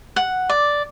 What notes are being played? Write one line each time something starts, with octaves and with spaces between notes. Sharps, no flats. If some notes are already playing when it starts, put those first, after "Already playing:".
F#5
D5